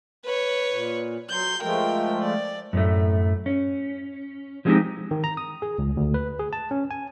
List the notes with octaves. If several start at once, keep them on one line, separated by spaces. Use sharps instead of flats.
B4 C#5
A#2
F#3 C6 G6
F3 G#3 A3 A#4 G5
D5
F#2 A2 A3
C#4
F3 F#3 G#3 C4 D#4 G4
D#3
A#5
D#6
G#4
C#2
D2
B4
G#4
A5
C#4
G#5